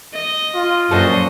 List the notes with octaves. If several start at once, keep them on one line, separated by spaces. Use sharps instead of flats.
D#5
F4
F#2 A#2 F3 D4 F#4 A4 C5 D#5